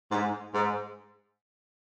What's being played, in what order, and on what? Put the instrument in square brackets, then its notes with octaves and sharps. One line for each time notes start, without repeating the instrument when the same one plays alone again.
[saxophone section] G#2
G#2